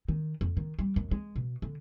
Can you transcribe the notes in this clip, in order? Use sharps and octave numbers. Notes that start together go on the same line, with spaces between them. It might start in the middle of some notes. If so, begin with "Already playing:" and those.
D#3
F2
D#3
G3
F#2
G#3
B2
D3